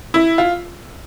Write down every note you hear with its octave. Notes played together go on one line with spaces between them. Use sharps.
E4
F4